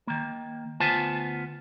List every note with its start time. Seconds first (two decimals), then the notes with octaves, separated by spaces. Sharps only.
0.07 D#3 A#3
0.80 D2 B3 F4 C5 G#5 A5